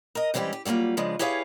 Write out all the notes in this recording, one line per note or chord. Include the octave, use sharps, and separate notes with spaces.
A#4 D#5
G#2 E3 G3 C4 C#4 G4
G4
F#3 G3 A3 A#3 F4
C#3 F3 G#3 D4
E4 G4 G#4 B4 C#5 F5